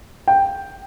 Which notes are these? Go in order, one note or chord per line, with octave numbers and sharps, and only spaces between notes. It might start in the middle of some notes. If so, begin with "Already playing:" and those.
G5